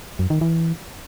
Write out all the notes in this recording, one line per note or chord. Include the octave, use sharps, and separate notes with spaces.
F#2
D#3
E3